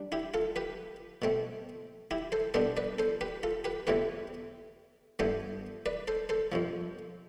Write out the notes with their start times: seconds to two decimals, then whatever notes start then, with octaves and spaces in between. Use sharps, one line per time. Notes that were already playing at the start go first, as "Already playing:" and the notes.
Already playing: G3 D4
0.12 E4 G4
0.34 F4 A4
0.56 G4 B4
1.22 B2 A3 C4
2.11 E4 G4
2.32 A4 C5
2.54 B2 G3 B3 D4 A4 C5
2.77 B4 D5
2.99 A4 C5
3.21 G4 B4
3.43 F4 A4
3.64 G4 B4
3.87 E2 C3 E3 A3 G4 B4
5.19 G2 E3 B3 A4 C5
5.86 B4 D5
6.08 A4 C5
6.29 A4 C5
6.52 F2 C3 F3